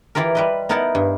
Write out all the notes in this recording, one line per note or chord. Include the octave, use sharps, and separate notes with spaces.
E3 E4 F4 G4 A#4
G3 B4 D#5
B3 D#4 E4 A#4 F#5 A5
G2